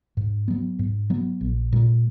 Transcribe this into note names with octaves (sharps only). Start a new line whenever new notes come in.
G#2
F#3 B3
G#2
F#3 B3
A#1
A#2 G#3